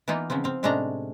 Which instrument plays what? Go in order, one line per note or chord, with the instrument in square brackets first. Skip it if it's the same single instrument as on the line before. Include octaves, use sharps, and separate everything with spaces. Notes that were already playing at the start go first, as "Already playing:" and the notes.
[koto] E3 A#3 B3 D#4 F4
C#3 F3 B3 C4
C4 F5
A2 C3 G#3 C#4 D4 A#5